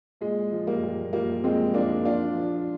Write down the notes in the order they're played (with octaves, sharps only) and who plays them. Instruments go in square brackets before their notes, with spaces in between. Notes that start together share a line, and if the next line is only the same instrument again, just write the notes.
[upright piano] A#2 G#3
F3
G3 A#3
A#2
F3 G3 A#3
A#2 G#3 C4
F3 A#3 D4
A#2 D4 F4
F3